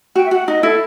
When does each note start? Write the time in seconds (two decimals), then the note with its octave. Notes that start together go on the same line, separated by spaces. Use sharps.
0.15 F#4 G5
0.26 E5
0.31 F#4 F#5
0.48 D#4 D#5
0.63 E4 A4